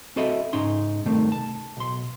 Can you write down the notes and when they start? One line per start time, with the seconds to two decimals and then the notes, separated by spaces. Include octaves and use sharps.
0.16 C4 F#4 A4 D#5 E5 B5
0.53 G#2 C#4 D#4 C6
1.06 G2 C3 D#3 A3
1.32 A5
1.77 B1 C6